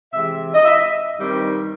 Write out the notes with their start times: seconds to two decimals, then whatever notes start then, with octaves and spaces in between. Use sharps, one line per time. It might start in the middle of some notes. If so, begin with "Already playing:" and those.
0.13 C3 E3 G#3 E5
0.54 D#5
0.65 E5
1.17 G2 D#3 G3 C4